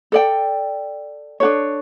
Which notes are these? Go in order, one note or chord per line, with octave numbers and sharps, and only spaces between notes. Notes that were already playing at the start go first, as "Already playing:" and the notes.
A4 D5 G5
D4 F#4 A4 C#5